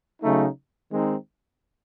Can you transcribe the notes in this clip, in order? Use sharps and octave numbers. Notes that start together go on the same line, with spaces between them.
C#3 F#3 A3 D#4
D#3 G#3 C4 D#4